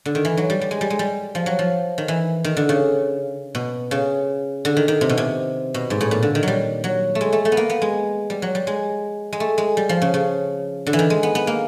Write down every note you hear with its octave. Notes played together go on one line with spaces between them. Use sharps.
D3
D#3
E3
F#3
G3
G3
G#3
G3
G#3
G3
F3
F#3
F3
D#3
E3
D#3
D3
C#3
B2
C#3
D3
D#3
D#3
C3
B2
C3
B2
G#2
A2
A#2
D3
D#3
F#3 G3
F#3
A3
G#3
A3
A3
B3
A#3
B3
G#3
G3
F#3
G3
G#3
G#3
A3
G#3
G3
F3
C#3
C#3
D3
E3
D#3
G#3
B3
B3
A#3